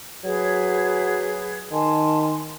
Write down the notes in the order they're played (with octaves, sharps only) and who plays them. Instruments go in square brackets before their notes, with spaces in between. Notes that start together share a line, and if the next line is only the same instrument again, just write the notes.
[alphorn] F#3 [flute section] G#4 B4 G#6
[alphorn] D#3 [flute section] G#5 A5 C6